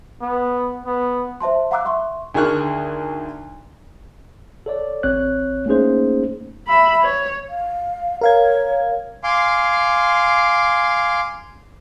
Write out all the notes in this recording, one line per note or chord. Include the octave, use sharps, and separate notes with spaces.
B3
B3
C5 E5 A5 C6
F5 F#5 A#5 D6 E6 F#6
E5 C6 C#6
D2 D#3 G#4 C#6 F6 F#6
A4 C#5 D5
A1 C4 C#5 F#6
A3 A#3 C#4 D#4 G#4 C5
E5 B5
C#5
F5
A#4 C#5 F5 G#6
F5 G#5 C6 D6